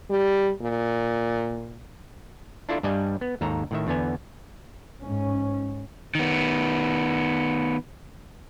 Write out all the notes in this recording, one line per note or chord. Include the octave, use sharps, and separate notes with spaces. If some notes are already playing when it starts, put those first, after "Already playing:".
G3
A#2
D4 E4 F4 A4 D5
G2 G3 D5 D#5 G#5
B3
D#2 G#2 A4 A#5
A2 D#3 E5
E2 D3 B3 G#5
G#2 C#4
D#3 B3